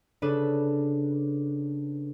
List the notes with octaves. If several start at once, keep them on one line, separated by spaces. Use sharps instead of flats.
C#3 D4 A4 B4 D#7